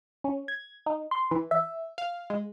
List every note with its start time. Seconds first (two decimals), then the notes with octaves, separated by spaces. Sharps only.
0.24 C#4
0.48 G#6
0.86 D#4
1.11 C6
1.31 E3
1.51 E5
1.98 F5
2.30 G#3